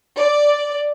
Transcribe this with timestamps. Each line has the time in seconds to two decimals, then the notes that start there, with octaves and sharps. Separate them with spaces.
0.17 D5